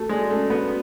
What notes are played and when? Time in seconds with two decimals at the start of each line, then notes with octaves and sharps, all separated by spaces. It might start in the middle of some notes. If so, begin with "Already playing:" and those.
Already playing: A3 F#4 A4
0.09 G#3 D5
0.29 A3 C#4
0.50 B3 F#4